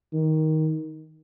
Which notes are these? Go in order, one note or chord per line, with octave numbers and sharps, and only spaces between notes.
D#3